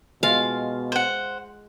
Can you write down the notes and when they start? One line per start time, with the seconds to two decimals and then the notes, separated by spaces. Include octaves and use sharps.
0.23 B2 G#3 F4 F5
0.92 C5 F#5